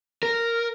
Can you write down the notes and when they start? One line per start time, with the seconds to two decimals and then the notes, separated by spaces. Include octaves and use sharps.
0.23 A#4